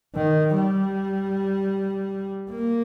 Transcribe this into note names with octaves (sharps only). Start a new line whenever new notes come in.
D#3
G3
A#3